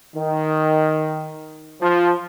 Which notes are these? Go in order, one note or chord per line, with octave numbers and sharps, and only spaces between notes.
D#3
F3